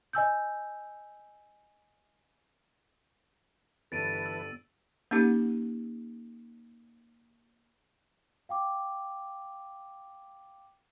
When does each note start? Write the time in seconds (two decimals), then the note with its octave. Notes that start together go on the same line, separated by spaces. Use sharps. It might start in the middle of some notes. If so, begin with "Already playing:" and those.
0.13 D#5 G#5 E6 G6
3.92 G1 E3 A4 B4 A6 D7 D#7
4.26 E6
5.11 A#3 C#4 D#4 G4 F#5
8.49 F5 G5 D6